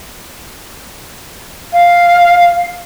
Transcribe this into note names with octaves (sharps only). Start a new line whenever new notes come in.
F5